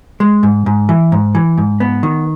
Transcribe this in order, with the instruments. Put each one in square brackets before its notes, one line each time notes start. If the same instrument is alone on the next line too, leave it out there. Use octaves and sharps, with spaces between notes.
[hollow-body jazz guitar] G#3
G#2
G#2
E3
G#2
E3
G#2
B3
D#3